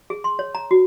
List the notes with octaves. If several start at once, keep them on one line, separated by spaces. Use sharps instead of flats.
G#4
C6
C#5
A#5
F#4